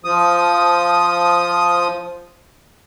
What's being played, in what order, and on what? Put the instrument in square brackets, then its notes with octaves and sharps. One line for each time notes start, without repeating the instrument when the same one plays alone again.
[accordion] F3 D#6